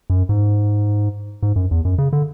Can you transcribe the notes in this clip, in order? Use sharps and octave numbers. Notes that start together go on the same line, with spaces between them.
F#2
G#2
G#2
F#2
E2
F#2
C#3
D3